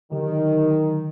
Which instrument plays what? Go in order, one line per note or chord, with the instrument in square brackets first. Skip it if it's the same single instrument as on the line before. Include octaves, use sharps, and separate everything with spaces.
[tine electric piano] D3 F#3 G4 [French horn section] D#3